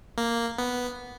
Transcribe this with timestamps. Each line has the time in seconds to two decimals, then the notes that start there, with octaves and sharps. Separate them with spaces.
0.18 A#3
0.58 B3